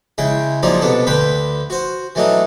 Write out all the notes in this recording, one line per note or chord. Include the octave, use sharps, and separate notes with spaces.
C#3 G#3 E4 G5
F3 F#3 G#3 A#3 D#4 D5
C2 B2 B3 D4 A4
D2 D3 B4 G5 B5 C6
F#4 C5
E3 F#3 A3 D4 D#4